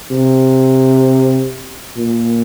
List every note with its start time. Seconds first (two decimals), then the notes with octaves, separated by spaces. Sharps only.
0.11 C3
1.97 A#2